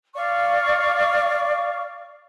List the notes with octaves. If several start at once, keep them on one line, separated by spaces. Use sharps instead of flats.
D5 F5 C#6